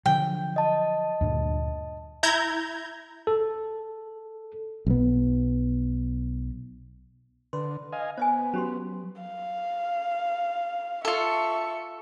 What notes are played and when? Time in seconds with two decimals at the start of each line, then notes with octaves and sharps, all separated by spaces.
0.06 D3 F3 F#3 G5
0.56 D#5 A5
1.21 D2 G2 A#2
2.23 E4 A#5 G6 G#6
3.27 A4
4.86 B1 B3
7.53 D3 B4 C6
7.93 D#5 F5 G#5
8.18 B3 C5 D#5 G#5
8.54 F#3 C#4 G4 C6
9.22 F5
11.05 F4 A4 E5 C#6